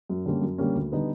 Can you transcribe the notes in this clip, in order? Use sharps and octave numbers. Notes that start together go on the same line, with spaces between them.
F#2
D3 G3 A#3 C#4
F#2
D3 G3 A#3 C#4
D2
D3 G3 B3 D#4